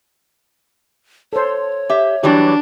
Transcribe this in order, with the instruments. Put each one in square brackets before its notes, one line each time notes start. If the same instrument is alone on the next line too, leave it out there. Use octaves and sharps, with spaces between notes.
[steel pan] A4 C5 [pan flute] C#5
[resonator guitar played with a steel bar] G4 E5
[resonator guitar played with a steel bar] E3 F#3 G3 [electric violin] D4 [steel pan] G4 D5